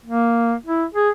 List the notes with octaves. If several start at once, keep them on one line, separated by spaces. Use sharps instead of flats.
A#3
E4
G#4